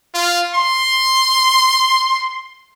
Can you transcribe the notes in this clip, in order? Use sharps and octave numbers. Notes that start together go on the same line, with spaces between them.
F4
C6